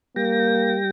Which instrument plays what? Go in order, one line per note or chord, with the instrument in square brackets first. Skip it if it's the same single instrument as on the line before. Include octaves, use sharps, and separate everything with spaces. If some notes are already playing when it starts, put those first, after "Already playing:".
[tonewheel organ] G3 G5 A#6 [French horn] A#3